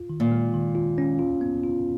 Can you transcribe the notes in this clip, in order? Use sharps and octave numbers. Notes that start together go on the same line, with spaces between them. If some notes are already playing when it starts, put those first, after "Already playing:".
Already playing: F4
D#3
A#2
G#3
D#3
F4
C#4
F4
B3
F4